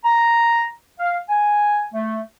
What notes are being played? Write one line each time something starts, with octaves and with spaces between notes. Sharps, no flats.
A#5
F5
G#5
A3